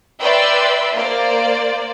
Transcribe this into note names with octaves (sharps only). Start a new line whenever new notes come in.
B4 D5 E5 G5 C6 E6
A#3 C5 D5